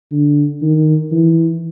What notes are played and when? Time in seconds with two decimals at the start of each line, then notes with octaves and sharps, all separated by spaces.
0.12 D3
0.62 D#3
1.12 E3